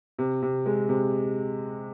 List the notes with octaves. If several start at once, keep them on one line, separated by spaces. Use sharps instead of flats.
C3
C3
G#3
C3